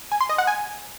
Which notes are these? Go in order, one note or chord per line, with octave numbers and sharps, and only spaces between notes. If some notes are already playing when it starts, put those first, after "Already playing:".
G#5
C6
D#5
F#5
G#5